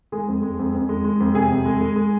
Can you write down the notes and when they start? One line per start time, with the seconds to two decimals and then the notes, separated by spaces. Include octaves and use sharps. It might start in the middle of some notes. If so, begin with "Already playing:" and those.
0.12 G#3 G#4
0.28 F2
0.43 G#3
0.59 F2
0.74 F2
0.89 G#3
1.04 G#3
1.20 F2
1.34 C3 G#4
1.51 F2
1.65 G#3
1.81 G#3
1.96 G#3